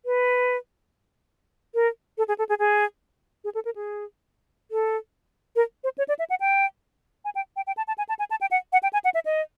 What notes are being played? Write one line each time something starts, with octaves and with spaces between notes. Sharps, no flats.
B4
A#4
A4
G#4
A4
G#4
G#4
G#4
A4
A#4
G#4
A4
A#4
C5
C#5
D5
E5
F#5
G5
G#5
G5
G5
G5
A5
A5
G#5
A5
G#5
A5
G5
F#5
F#5
G5
G#5
F#5
E5
D#5